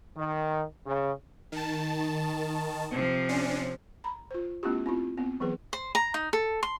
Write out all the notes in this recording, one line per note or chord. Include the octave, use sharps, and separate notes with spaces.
D#3
C#3
D#3 A5
C3 F3
C#4 D4
A#5 B5
F4 C5
A3 B3 C#4 E4 F4 G4
C4 E4 F4
B3 C4
E3 F#3 B3 G#4 B4
C5
A#5
D#4
A4
C6